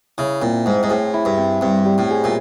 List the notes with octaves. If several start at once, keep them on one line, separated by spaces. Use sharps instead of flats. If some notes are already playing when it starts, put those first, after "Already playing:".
C#3 E4
A#2 C4
G#2 C4
G#2
A2 G#4
E4
G2
C4
G2 C4
G3
A2
G#4
A#2